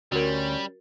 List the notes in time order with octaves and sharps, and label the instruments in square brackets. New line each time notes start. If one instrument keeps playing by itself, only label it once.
[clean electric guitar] D2 [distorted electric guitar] G3 [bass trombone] C#4 [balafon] F#4 A#4